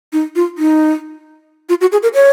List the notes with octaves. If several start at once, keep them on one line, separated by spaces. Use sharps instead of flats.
D#4
F4
D#4
F4
F#4
G#4
A#4
C#5